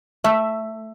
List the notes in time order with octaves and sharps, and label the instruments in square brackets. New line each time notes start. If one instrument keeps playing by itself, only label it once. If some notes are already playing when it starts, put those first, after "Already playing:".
[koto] A3 [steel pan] E5